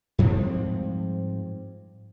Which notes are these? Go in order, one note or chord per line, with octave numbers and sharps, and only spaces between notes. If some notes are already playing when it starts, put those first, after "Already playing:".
G#2 F3 G3 C4